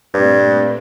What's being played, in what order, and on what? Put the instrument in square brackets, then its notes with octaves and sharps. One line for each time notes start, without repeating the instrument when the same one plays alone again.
[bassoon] G2 [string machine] A#2 A3 C4